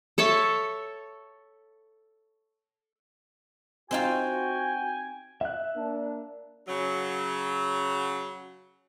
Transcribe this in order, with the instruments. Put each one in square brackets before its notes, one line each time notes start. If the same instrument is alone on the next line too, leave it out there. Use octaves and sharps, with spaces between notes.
[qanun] A4 C#5 E5 A5
[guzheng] C4 D#4 F4 [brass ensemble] F#4 [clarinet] G5 [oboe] G#5
[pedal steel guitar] E5 F#6
[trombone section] A#3 D4
[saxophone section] C#3 F#3